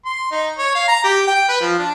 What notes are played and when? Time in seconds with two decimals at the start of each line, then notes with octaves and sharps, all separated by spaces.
0.05 C6
0.31 D#4
0.58 C#5
0.75 F5
0.88 A#5
1.04 G4
1.27 G5
1.49 B4
1.61 F3
1.79 D4